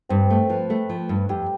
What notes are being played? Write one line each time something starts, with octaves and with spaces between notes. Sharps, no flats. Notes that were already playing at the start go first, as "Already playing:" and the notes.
G2 C4
A3 A4
F3 B4
A3
F3
G2
F2 G4